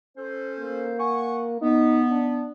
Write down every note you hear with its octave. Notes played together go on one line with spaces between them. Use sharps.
C#4 A4 C5
A#3
F#5 G#5 C#6
B3 D#4
D4